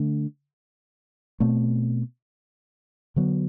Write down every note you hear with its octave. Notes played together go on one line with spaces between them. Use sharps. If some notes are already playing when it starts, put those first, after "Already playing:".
Already playing: D3 A3 D4
B2 A3 C4
D3 F#3 B3